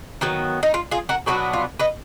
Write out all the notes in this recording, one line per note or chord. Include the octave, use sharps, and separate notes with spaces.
D#3 F#3 B3
D#4
F4
F4 G#4
F#4 A#4
B2 F#3 B3 D4 F#4 A#4
F4
B4 D#5